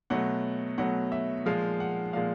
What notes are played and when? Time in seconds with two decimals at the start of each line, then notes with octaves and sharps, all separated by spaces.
0.10 B2 F#3 A3 F#5
0.78 B2 F#3 A3 F#5
1.12 E5
1.46 A#2 F3 G#3 F5
1.80 F#5
2.13 A#2 F3 G#3 F5